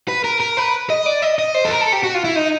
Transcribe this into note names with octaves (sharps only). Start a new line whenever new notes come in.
B4
A#4
A#4
B4
D#5
D5
D#5
D#5
C5
A4
A#4
A4
G4
F#4
F4
E4
D#4